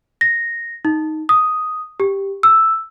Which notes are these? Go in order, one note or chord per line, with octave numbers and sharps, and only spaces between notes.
A#6
D#4
D#6
G4
E6